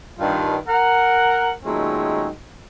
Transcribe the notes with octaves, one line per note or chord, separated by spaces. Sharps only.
G2 D#3 F4
A#4 F#5
A#2 D#3 F#3 G#3 A3 C#4